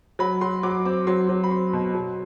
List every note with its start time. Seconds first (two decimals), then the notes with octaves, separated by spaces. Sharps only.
0.19 F#3 B5
0.41 F#3 C6
0.63 F#3 D6
0.85 C4 D6
1.07 F#3 C6
1.29 F#3
1.44 B5
1.51 C4 C6
1.73 B2
1.95 F#3